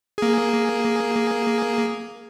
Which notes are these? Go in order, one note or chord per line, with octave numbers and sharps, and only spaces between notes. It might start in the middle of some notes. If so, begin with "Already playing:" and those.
A#3 G#4